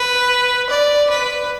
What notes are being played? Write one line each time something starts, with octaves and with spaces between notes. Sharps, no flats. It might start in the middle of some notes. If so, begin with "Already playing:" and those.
Already playing: B4
D5
B4